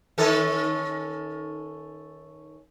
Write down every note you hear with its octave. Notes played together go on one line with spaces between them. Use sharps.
D#3 C#4 A4